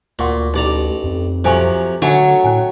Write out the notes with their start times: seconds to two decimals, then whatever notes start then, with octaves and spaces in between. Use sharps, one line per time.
0.19 D2 A#2 F#5 C6 C#6
0.54 A1 D#4 G4 D5 A#5
1.04 F2
1.44 C3 F3 F#3 A4 G#5 C#6
2.02 D3 F#3 A3 D4 F#4 C#5 G#5
2.44 A2 C#4 G#5